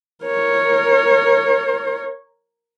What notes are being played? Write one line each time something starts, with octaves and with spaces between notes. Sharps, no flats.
A#4 C#5